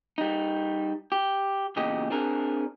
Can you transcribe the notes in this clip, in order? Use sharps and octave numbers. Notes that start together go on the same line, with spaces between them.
G3 D#4
G4
E2 A#2 C#3 G4 D#5
C4 D4 G#4 A#4